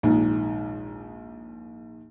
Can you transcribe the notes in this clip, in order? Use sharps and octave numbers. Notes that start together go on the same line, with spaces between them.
A#1 D#2 G#2